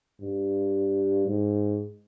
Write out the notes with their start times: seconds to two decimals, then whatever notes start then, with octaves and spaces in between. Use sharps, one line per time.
0.21 G2
1.27 G#2